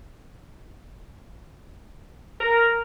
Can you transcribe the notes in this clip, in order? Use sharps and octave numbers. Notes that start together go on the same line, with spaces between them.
A#4